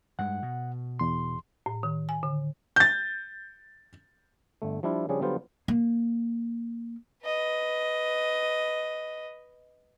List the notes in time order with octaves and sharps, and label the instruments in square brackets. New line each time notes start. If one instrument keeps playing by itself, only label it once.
[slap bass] G2 G#3 [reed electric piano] F#5
[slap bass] B2
[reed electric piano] E2 C6
[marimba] A2
D#3
G#5
D3
[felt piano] G6 A6
[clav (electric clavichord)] G1 A3
F3 G3 D4 E4 F4
C#3 F3 G3 C#4 D4 G#4
D3 F#3 G3 B3 F4 C5
[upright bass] A#3
[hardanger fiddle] B4 D#5